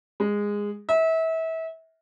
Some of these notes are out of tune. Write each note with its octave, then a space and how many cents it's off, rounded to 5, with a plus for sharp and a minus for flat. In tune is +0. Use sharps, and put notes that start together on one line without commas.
G#3 -15
E5 -30